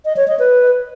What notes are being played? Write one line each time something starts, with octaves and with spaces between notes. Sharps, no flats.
D#5
C#5
D#5
B4